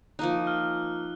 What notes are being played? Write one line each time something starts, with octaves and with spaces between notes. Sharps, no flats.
F3 A#3 D#4 F#6
F6